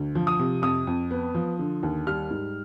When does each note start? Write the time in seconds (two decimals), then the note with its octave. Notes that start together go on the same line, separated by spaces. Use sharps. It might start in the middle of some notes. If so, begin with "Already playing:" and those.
Already playing: D2
0.15 F3
0.27 D#6
0.39 C3
0.62 F2 D#6
0.87 F2
1.11 B3
1.35 F3
1.59 D3
1.83 D#2
2.07 G3 F6
2.31 G#2